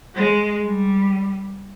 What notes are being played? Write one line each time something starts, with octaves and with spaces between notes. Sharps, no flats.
G#3
G3